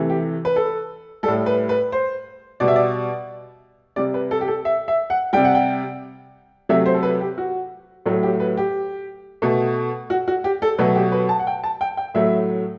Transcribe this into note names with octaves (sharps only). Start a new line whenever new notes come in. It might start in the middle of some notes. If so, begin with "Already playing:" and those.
Already playing: C3 E3 A3
G4
B4
A4
G3 A4
A2
B4
B4
C5
B2 G3 D5
E5
D5
C3 G3 D5
B4
A4
G4
A4
E5
E5
F#5
C3 G3 G5
F#5
G5
C3 F#3 A3 E5
C5
A4
B4
G4
F#4
A2 F#3 A3
G4
B4
G4
B2 A3
F#4
F#4
G4
A4
B2 F#3 A3 B4
G4
B4
A5
F#5
G5
A5
G5
G5
A2 F#3 A3 E5